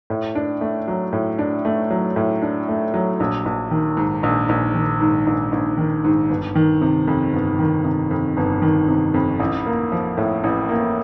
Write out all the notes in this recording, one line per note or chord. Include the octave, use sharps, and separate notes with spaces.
A2
D4
A3
F#3
A2
D4
A3
F#3
A2
D4
A3
F#3
A#1
A#1
D#3
G#2
A#1
A#1
D#3
G#2
A#1
A#1
D#3
G#2
G1
D#3
C3
F2
G1
D#3
C3
F2
G1
D#3
C3
F2
A1
A#3
F3
A2
A1
A#3